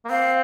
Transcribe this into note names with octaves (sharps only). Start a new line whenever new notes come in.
A#3
C4 F5